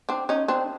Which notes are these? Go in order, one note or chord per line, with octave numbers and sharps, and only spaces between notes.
C4 D4
C#4 D#4
C4 D4